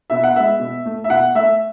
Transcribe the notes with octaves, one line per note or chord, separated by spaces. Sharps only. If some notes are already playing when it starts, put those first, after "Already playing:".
B2 E5
F#5
G#3 B3 E5
B2
A3
E5
B2 F#5
A3 E5